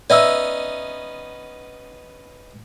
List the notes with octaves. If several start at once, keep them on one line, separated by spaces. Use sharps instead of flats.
B3 C#4 D#4 D5 E5 E6